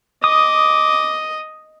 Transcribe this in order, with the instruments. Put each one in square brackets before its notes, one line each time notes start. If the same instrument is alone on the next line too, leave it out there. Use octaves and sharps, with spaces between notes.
[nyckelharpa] D#5 [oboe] D6 [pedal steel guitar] D#6